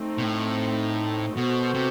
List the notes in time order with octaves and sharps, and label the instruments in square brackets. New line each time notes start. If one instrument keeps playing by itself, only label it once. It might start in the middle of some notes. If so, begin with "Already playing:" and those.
Already playing: [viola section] A3 C4 D#4
[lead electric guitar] B2
A2
[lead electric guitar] B2 [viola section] B3 F#4 A4 C5
[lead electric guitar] C3